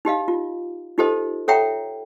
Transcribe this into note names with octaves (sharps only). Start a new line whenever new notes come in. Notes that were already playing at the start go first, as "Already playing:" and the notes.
D#4 G4 D#5 F5
F4
D#4 F4 G4 A4 C5 D#5
A4 C#5 E5 F#5 G5 A#5